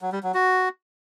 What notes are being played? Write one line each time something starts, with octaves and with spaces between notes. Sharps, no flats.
F#3
G3
F#3
F#4